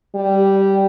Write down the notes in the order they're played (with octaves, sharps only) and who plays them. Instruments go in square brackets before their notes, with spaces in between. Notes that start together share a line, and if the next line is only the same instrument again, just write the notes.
[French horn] G3